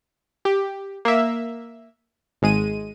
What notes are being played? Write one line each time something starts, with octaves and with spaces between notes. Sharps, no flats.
G4
A#3 E5
G#1 G#3 D#7